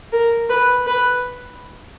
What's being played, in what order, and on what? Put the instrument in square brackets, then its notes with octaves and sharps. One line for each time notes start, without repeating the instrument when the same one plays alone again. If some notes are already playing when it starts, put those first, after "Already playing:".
[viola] A#4
B4
B4